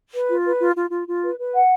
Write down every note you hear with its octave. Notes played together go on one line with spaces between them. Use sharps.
B4
F4
B4
F4
F4
F4
F4
B4
B4
F#5